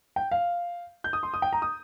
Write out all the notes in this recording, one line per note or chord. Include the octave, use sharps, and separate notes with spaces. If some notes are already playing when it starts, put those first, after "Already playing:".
G5
F5
G6
D#6
C6
D#6
G5
A#5
D#6